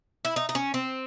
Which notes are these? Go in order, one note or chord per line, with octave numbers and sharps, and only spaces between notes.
E4
D#4
D#4
C#4
C4